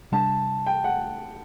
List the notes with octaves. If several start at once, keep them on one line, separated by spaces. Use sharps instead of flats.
C3 G3 D4 A5
G5
F#5